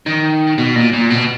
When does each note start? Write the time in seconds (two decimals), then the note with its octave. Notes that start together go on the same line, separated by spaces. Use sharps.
0.06 D#3
0.58 B2
0.75 A#2
0.93 A#2
1.10 B2